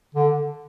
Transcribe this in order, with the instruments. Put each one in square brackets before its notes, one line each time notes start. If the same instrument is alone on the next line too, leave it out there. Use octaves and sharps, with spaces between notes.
[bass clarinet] D3